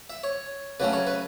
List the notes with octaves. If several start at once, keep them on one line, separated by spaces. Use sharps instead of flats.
E5
C#5
C#3 F#3 A3 C#4 B4
C#5
B4